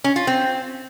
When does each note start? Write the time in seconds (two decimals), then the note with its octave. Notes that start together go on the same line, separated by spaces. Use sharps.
0.04 C#4
0.16 F4
0.27 C4